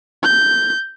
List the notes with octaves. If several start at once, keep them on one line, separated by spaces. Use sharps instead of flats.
G6